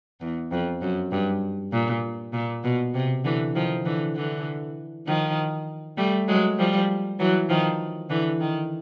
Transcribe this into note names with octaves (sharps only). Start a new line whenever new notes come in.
E2
F2
F#2
G2
A#2
A#2
B2
C3
D3 E3
D#3 F3
D3 E3
D3 E3
D#3 F3
G3 A3
F#3 G#3
F3 G3
E3 F#3
D#3 F3
D3 E3
D#3